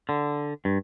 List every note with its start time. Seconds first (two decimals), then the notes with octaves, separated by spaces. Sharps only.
0.09 D3
0.65 G2